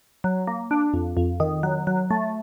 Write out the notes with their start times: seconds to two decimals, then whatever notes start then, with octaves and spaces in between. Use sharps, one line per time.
0.24 F#3
0.47 A#3
0.71 D4
0.93 F2
1.17 F2
1.40 D#3
1.63 F#3
1.87 F#3
2.11 A3